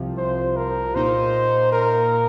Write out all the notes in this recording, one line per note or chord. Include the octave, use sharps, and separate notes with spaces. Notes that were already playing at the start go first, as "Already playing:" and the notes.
Already playing: C2 C3 F3
C5
A#4
A#2 A#3 D#4 C5
A#4